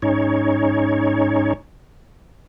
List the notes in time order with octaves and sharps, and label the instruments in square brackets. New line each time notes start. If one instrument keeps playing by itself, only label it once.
[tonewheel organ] G#2 C#4 D#4 C#5